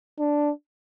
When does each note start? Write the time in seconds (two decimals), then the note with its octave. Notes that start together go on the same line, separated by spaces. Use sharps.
0.19 D4